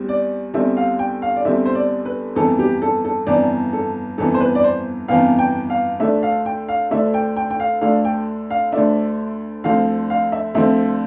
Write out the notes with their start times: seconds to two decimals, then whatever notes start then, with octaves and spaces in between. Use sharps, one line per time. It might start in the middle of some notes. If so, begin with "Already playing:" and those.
Already playing: E2 G3 C4
0.09 D5
0.54 E2 D3 G3 C4 E5
0.77 F5
0.99 G5
1.22 F5
1.36 D5
1.45 E2 D3 G3 C4 E5
1.65 C5
1.75 D5
2.05 B4
2.35 G1 F2 E3 B3 A4
2.59 G4
2.82 A4
3.05 A4
3.27 G1 F2 E3 B3 D5
3.73 A4
4.18 G1 F2 E3 B3 A4
4.34 C5
4.40 B4
4.55 D5
4.64 C5
5.08 G1 F2 E3 B3 F5
5.39 G5
5.70 F5
6.00 D2 D3 A3 D4 E5
6.23 F5
6.46 G5
6.68 F5
6.91 D2 D3 A3 D4 E5
7.14 G5
7.36 G5
7.50 G5
7.60 F5
7.81 D2 D3 A3 D4 F5
8.05 G5
8.50 F5
8.72 D2 D3 A3 D4 E5
9.64 D2 D3 F3 C4 F5
10.10 F5
10.32 E5
10.55 D2 D3 F3 C4 E5